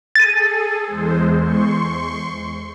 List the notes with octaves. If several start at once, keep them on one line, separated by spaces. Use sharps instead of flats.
G#4 A4 A6 D#7
E2 G#3 C5
C6 C#6